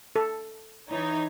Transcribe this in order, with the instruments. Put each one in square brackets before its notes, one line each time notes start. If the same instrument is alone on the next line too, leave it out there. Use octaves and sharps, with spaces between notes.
[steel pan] A4
[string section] E3 D#4 C#5